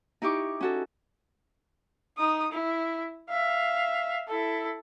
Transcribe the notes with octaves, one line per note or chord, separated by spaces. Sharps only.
D#4 E4 G4 C#6 D6
C#4 F#4 A4
D#4 D#6
E4
E5 F5
E4 A4